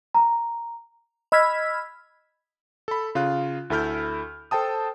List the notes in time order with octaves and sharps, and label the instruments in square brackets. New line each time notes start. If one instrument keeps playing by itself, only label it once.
[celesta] A#5
[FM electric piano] D#5 B5 E6 F6 G#6 B6
[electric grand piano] A4 B5
C#3 F4 F5 F#6
D2 E4 A4 B5 F6 G6
A4 C5 G5 A5 D#6